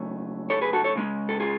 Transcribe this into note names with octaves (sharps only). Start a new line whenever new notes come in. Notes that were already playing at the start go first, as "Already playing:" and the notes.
Already playing: C#3 F#3 A3 C#4
A4 C#5
G#4 B4
F#4 A4
A4 C#5
C#3 G#3 C#4
A4
F4 G#4